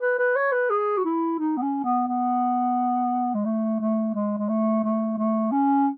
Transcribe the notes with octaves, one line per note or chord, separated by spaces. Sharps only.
B4
B4
C#5
B4
G#4
F#4
E4
D#4
B3
C#4
B3
B3
G#3
A3
A3
G#3
G#3
A3
A3
A3
C#4